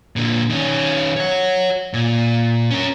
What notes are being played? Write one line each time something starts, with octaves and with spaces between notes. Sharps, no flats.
A#2 D3
D#3 C#4
C#5 F#5
A#2
C#4 A#4